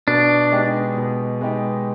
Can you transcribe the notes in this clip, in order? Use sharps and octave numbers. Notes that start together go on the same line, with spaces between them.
B2 D4
G#3 B3 D#4 G4
B2
G#3 B3 D#4 G4